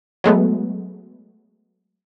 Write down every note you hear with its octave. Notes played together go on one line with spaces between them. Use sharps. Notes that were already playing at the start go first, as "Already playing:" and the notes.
F#3 G#3 A3 B3